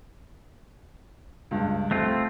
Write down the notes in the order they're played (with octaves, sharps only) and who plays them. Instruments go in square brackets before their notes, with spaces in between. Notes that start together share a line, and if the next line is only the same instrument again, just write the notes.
[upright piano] C#2 G2
[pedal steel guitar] A3 C4 F4